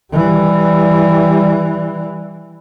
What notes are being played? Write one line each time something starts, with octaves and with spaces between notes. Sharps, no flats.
E3 G3